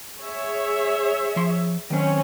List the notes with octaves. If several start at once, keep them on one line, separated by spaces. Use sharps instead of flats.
G#4 C#5 E5
F3 C6
D#3 F#3 C4 C#4